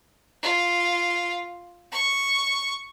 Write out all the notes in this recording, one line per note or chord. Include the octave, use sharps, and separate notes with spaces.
F4
C#6